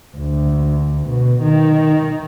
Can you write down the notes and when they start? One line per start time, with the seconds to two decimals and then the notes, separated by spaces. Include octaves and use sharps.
0.17 D2
1.08 B2
1.43 D#3